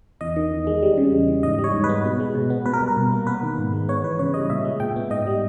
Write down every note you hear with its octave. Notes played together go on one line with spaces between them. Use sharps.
E2 D#5
D#3
E2
G#3
G3
C#3
E2
E3
G#2 D#5
G3
C#5
G#2
B4
B3
B2
G#3
B2
B3
B2 B4
A#4
G3
A#4
B2
A#3
B3 B4
D#3
G#2
G#3
B3 C#5
E3 B4
C#3 C#5
G3 D#5
A#2 E5
G#3
A#2 G5
B3
G#2 D#5
G3